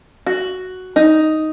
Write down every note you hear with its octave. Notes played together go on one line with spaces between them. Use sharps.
F#4
D#4